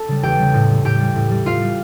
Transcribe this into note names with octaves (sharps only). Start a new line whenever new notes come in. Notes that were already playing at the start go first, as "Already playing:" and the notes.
Already playing: A4 A5
C#3 G3
E2 G4 G5
C#3 G3
A2
G3
A2 G4 G5
G3
A2
G3
A2 F4 F5
G3